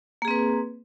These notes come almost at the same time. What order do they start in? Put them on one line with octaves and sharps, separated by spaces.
A#3 G#4 C4 B4